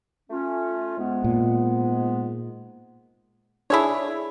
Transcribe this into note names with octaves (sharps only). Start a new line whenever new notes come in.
A3 C#4 F4
G#2 G#3 B3
A#2
D4 E4 G#4 A4 C#5